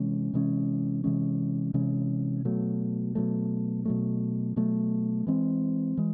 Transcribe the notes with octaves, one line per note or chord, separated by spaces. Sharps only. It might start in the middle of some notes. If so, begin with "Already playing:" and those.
Already playing: C3 E3 G#3 C#4
C3 E3 G#3 C#4
C3 E3 G#3 C#4
C3 E3 G#3 C#4
B2 F#3 A3
B2 F#3 A3
B2 F#3 A3
B2 F#3 A3
E3 G#3 C4
E3 G#3